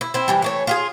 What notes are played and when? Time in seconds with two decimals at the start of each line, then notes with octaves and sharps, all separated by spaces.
0.01 E4
0.14 C4 E4
0.28 C3 E3 G3
0.42 E3 A3 C#5
0.67 F4 G4 G#4